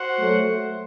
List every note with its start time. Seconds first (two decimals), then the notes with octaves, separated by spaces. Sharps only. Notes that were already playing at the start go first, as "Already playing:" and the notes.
Already playing: F#4 C5 F#5
0.20 F#3 A3